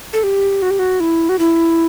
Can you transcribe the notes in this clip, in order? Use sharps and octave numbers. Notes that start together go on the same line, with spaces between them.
A4
G4
F#4
G4
F#4
E4
F#4
E4